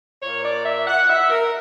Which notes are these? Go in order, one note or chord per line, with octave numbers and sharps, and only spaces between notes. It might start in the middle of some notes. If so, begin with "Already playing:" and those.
A#2 A#3 C#5
D5
E5
F#5
E5
A#4